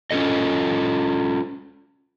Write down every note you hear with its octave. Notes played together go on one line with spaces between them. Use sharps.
C#4 F4 A4 D#5